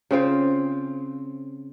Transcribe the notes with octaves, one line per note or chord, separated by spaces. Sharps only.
C#3 C4 F4 C5